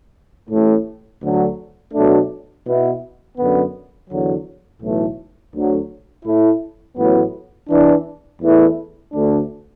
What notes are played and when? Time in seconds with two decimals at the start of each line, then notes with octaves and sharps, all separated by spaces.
0.49 A1 A2 A3
1.21 D2 D3 F#3
1.94 B2 F#3 A3 D4
2.65 B2 B3 E4
3.37 F#2 D3 B3
4.08 E2 D3 F#3
4.81 B1 A2 E3 A3
5.52 D2 D3 F#3
6.24 A2 A3 E4
6.97 A1 A2 F#3 B3
7.69 E2 E3 D4
8.41 E2 E3 A3 E4
9.12 D2 D3 A3 D4